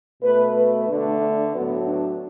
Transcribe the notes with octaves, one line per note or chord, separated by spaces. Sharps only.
B2 A3 B4
B4
D3 A3 D4
D4
A2 F#3 A3 B3
D4